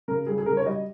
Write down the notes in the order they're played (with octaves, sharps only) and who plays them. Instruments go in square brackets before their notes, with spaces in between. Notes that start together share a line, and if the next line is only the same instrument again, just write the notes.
[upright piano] C#3 A#4
G3 G#4
G#4
C#3 A#4
C#5
G3 D#5